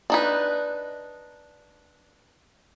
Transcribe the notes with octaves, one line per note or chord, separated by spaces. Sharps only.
D4 D#4 B4